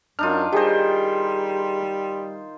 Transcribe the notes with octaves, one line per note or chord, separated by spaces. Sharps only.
F#2 D4 D#4 F4 F6
D#3 G3 G4 G#4 C5 D#5